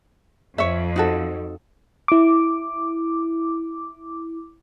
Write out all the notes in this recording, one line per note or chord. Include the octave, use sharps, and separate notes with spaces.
F2 C#5 E5
D#4 F#4 A4
E4 D6